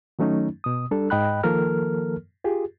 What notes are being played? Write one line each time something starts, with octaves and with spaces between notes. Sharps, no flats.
D#3 F#3 A3 C#4 D#4
B2 D#6
G3 D4 A4
G#2 D#5 G5 B5 F#6
D#3 F3 A#3 A4 A#4 F6
F4 G4 G#4